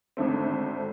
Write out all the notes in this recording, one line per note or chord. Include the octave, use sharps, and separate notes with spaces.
G#1 D3 A3 C4